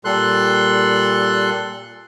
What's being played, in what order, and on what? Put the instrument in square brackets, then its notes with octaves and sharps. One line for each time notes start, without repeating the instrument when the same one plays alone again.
[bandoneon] A#2 G3 A4 C6 F#6